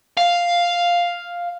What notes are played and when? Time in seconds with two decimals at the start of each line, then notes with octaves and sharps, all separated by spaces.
0.17 F5